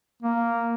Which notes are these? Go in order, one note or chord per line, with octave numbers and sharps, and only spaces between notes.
A#3